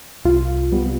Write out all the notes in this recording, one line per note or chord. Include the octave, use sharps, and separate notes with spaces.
C2 F4
C3 G3 B3